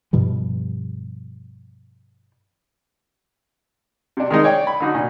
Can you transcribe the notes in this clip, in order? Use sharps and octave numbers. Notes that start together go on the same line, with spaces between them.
G2 B2 F3 G3
C3 D4
D#3 G#3 D#4
C#5 D5 G5
B5
D3 D#4 F#4
A#2